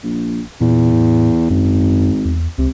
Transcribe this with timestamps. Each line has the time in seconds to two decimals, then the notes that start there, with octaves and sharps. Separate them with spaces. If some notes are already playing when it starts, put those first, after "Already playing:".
0.04 A#1
0.61 E2 A#2
0.92 A2
1.50 G#1 F#2
2.25 E2
2.58 C#2 C3